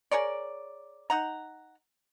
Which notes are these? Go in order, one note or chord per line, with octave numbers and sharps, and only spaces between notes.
G#4 A#4 C#5 D5
D#4 F#5 A#5